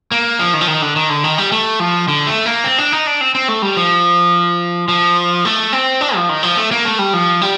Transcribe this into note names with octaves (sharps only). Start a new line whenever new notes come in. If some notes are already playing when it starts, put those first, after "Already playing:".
A#3
F3
D#3
F3
D#3
D3
D#3
D3
D#3
G3
A3
F3
D3
A3
A#3
C4
D4
D#4
D4
C4
C4
A3
G3
F3
F3
A3
C4
D4
F3
D#3
F3
A3
A#3
A3
G3
F3
G3